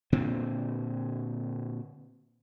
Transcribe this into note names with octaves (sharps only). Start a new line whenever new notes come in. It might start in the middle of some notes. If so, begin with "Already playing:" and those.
A#2 D3 C4